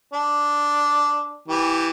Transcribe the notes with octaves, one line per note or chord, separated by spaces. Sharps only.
D4
E3 G4